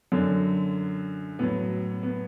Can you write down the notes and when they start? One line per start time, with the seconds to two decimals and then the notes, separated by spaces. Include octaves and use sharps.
0.12 F#2 D3 F#3
1.39 A2 F#3 B3
2.03 B3